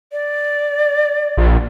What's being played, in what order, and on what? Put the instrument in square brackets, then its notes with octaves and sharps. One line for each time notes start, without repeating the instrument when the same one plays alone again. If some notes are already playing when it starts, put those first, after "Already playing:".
[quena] D5
[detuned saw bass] A#1